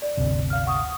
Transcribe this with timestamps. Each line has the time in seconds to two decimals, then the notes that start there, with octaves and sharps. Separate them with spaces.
0.02 D5
0.17 G1 D2 C3
0.50 F5 F6
0.66 F#5 C#6 D#6